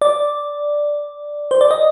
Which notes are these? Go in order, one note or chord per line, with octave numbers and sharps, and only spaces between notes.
D5
C5
D5
D#5